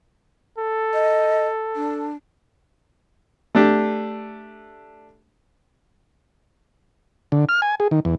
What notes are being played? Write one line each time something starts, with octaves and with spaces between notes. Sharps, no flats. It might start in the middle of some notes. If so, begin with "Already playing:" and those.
A4
D#5
D4
A3 D4 G4
D3
F6
G#5
G#4
D#3
E2